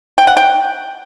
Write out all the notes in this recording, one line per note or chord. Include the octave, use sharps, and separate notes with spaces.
G5
F#5
G5